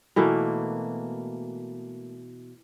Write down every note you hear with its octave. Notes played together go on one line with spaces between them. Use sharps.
B2 E3 A3 A#3